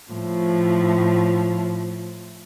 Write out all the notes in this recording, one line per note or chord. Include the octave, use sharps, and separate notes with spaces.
A2 F3